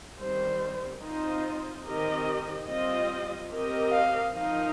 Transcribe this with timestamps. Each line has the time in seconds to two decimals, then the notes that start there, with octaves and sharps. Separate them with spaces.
0.21 D#3 G3 C4 C5
1.03 C4 D#4 F4 C5 D#5
1.85 D#3 C4 G4 A#4 D#5
2.68 G3 C4 F4 D#5
3.50 C4 G4 A#4 D#5
3.91 F5
4.33 F3 D#4 A#4 D#5 F5